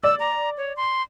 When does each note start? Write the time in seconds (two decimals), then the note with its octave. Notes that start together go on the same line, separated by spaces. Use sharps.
0.03 D5 E6
0.20 A#5
0.57 C#5
0.77 C6